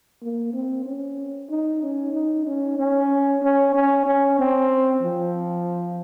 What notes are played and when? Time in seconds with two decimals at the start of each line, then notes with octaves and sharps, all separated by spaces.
0.22 A#3
0.53 C4
0.86 C#4
1.49 D#4
1.82 C#4
2.13 D#4
2.46 C#4
2.79 C#4
3.42 C#4
3.74 C#4
4.06 C#4
4.39 C4
5.03 F3